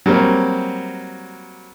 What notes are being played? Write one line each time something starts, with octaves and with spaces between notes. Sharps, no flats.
F#3 G3 A#3 C4